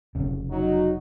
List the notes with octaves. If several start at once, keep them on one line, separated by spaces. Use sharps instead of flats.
F1 C#3
F#3 D#4 F#4